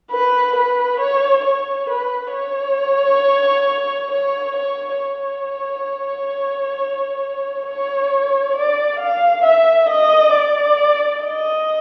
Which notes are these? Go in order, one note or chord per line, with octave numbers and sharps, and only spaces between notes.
B4
B4
C#5
C#5
B4
C#5
C#5
C#5
C#5
C#5
D5
F5
E5
D#5
D5
D#5